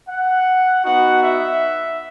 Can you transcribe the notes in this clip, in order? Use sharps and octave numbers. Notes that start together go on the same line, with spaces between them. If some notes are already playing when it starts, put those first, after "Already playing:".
F#5
B3 D#4 F#4 F#5
E5